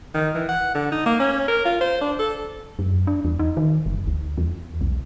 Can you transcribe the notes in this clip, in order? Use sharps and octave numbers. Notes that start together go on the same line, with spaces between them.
D#3
E3
F#5
D3
D#4
A#3
C#4
A#4
F4
C5
D4
A4
F#2
D4
E2
D#4
D#3
F#1
D2
E2
B1